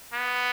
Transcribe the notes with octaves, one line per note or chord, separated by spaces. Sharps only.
B3